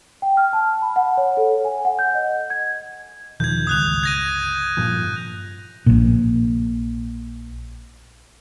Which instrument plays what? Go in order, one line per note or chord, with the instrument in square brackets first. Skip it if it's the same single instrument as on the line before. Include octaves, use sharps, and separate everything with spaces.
[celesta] G5
F6
A5
B5
F#5
C#5
A4
G#5
F#5
G6
D#5
G#6
[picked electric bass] E1 D#3 F3 [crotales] G6 G#6
[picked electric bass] G1 C#2 [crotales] D#6 F#6 F7
[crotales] G#6 A#6 D#7
[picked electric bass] G2 A#2 F3
[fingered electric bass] A#1 A#2